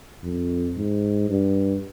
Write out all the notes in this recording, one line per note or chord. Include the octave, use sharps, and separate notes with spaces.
F2
G#2
G2